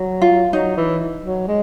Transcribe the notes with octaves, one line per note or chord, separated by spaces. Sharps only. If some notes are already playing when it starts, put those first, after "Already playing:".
Already playing: F#3
F4
F#3 D#4
E3
F#3
G#3